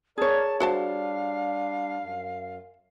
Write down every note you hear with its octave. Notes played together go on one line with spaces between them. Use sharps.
G#4 A#4 C#5 D5 A5
G3 D4 F#4 C5 F5 A5
F#2